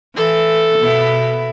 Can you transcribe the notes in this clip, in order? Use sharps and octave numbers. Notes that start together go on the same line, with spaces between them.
E3 A4
B2 B3 E4